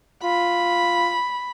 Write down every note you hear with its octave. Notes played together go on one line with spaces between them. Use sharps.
F4 B5